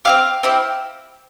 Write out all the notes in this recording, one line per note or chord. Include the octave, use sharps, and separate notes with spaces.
C4 E4 G4 F5
C4 E4 G4